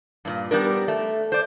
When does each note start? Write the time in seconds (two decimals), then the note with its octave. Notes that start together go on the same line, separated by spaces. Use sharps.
0.25 G2 A#2
0.51 G3 B3 D4 A#4
0.88 A3
1.32 C5 D5